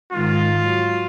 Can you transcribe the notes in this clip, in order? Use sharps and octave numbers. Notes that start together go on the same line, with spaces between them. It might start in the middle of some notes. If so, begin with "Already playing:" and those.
G#2 D#3 F4
F#3